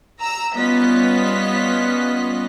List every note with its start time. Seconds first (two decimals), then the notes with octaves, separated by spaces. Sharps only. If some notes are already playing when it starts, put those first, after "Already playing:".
0.19 A#5 E6
0.54 G3 B3 C#4 F4 D#5 B6